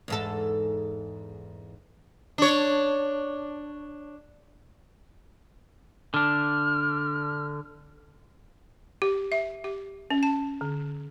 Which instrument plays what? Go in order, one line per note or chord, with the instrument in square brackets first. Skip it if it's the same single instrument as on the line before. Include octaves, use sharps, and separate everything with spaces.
[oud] E2 G#2 A4
[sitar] D4 C#5
[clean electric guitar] D3 D4 [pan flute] F6
[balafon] G4
E5
G4
C#4
A5
D3